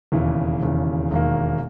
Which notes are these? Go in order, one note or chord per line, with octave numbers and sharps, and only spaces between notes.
E1 D#2 C#3 E3
E1 D#2 C#3 E3
E1 D#2 D#3 A#3